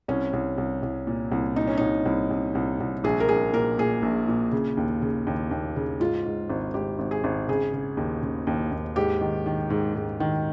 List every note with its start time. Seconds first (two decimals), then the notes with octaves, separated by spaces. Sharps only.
0.08 C2 C#4
0.33 C2
0.58 C2
0.82 C2
1.07 A#2
1.32 C2
1.56 A#2 D#4
1.67 C#4
1.77 C2 D#4
2.06 C2
2.31 C2
2.55 C2
2.80 C2
3.04 A#1 G#4
3.20 A#4
3.29 A#1 G#4
3.54 A#2 A#4
3.78 A#2 G#4
4.03 A#1
4.28 A#2
4.52 C#3
4.77 D#2
5.02 C#3
5.27 D#2
5.51 D#2
5.76 C#3
6.00 G#2 F4
6.26 G#2
6.50 G#1
6.74 G#1 G4
6.99 G#1
7.11 G#4
7.24 G#1
7.48 C#3 G#4
7.73 C#3
7.97 D#2
8.23 C#3
8.47 D#2
8.72 D#2
8.96 G#2 G4
9.21 D#3
9.46 D#3
9.70 G#2
9.95 G#2
10.20 D#3